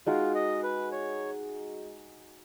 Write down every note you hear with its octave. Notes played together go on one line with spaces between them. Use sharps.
G#3 D#4 F4 F#4
D#5
B4
C#5